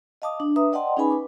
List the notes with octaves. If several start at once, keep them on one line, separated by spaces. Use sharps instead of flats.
D#5 F5 A5 D6 D#6
D4
D4 B4 E5 A#5 D#6
D5 D#5 F#5 G5 A5 C6
C#4 D#4 G#4 B4 G#5 B5
B4 D6